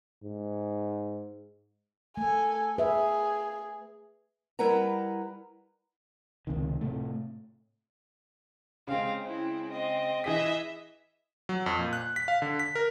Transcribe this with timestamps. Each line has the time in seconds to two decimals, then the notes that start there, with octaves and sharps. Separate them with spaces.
0.24 G#2
2.17 A3 A4 G#5
2.78 G#4 B4 E5
4.59 G3 E4 A#4 B4 F#5 A#5
6.47 C#2 C3 D#3
6.81 A2 C3 A3
8.87 C#3 G#3 C4 F5
9.23 C4 E4
9.72 C4 D#5
10.24 E3 G#4 D#5 E5 B6
11.49 F#3
11.66 F2
11.79 A#2
11.93 F#6
12.16 B6
12.28 F5
12.42 D3
12.59 B6
12.75 A#4